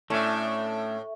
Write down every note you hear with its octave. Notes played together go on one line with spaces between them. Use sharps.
A2 A3 C#4 D4